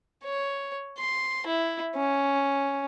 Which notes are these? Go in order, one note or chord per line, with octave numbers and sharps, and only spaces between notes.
C#5
C6
E4
C#4